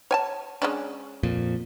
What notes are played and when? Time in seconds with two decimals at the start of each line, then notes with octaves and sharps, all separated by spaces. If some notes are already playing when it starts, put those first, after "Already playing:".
0.11 C#5 G#5 A5
0.62 G#3 C#4 D4
1.23 F2 A#2